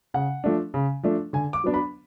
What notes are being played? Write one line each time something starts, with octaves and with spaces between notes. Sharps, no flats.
C#3 F#5
F3 A3 D4
C#3
F3 A3 D4
D3 G#5
D6
F#3 B3 D4
B5